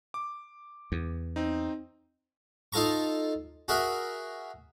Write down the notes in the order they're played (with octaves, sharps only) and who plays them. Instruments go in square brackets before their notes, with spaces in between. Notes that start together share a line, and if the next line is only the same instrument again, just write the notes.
[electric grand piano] D6
[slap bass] E2
[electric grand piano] C4 D#4
[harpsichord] D#4 F4 A4 A#5 C#6
F#4 G#4 A#4 E5